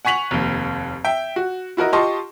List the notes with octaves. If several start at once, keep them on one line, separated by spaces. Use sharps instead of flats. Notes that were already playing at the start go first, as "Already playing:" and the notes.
F#5 G#5 C#6 B6 F7 F#7
F1 D#2
E5 G5
F#4
E4 F#4 A#4 D#5
F4 G4 D#5 A5 C6 C#6